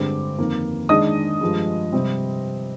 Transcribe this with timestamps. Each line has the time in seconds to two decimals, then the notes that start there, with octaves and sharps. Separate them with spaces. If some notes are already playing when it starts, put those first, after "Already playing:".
Already playing: G2 D3 G#3 C4 D6
0.39 F2 D#3 A#3
0.89 D#3 G#3 D4 D#5 D#6
1.41 G2 F3 G#3
1.92 C3 G3 C4